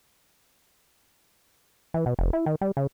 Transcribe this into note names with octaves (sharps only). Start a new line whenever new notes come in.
E3
B2
F1
E4
D#3
G3
C#3